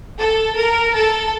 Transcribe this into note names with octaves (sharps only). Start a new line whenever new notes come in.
A4
A#4
A4